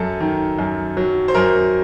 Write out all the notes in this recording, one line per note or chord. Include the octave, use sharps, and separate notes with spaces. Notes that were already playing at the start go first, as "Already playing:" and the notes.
Already playing: F#2 A4
D#3
F#2
F#3
C5
F#2 A#4